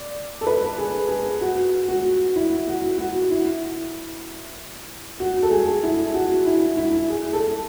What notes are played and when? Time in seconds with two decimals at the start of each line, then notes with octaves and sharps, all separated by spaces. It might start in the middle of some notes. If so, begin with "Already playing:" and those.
Already playing: D5
0.41 A4
0.47 B4
0.78 G#4
1.09 G#4
1.41 F#4
1.89 F#4
2.36 E4
2.67 F#4
2.98 F#4
3.31 E4
5.20 F#4
5.43 A4
5.51 G#4
5.83 E4
6.14 F#4
6.46 E4
6.77 E4
7.10 G#4
7.33 A4